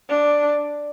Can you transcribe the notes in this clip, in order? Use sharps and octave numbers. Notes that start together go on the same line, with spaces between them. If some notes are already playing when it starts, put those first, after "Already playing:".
D4